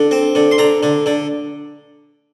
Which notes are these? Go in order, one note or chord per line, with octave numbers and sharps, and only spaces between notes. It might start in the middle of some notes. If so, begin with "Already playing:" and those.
Already playing: D3
C4
D3
C6
D3 A#5
D3
D3